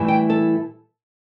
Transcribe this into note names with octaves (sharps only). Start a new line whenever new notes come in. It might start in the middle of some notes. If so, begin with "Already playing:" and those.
Already playing: A2 E3 G3 E4
G5
A4